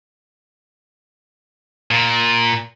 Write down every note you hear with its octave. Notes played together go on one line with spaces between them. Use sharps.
A#2